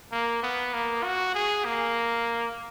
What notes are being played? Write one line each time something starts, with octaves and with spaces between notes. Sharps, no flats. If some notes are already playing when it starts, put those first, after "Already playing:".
A#3
B3
A#3
F#4
G#4
A#3